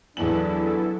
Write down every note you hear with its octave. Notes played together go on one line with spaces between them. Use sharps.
E2 F#3 B3 D4 E4 A4 F#7